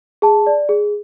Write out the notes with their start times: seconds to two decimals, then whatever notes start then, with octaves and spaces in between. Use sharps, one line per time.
0.22 G#4 A5
0.47 D5
0.69 G#4